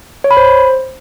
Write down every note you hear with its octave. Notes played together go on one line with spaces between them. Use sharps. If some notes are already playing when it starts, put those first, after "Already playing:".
C#5
B5
C5